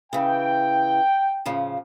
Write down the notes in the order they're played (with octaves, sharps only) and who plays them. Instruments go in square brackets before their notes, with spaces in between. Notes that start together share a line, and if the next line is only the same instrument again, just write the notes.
[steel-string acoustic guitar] C#3 E3 [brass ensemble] G5
[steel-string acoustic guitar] A2 C#3 F3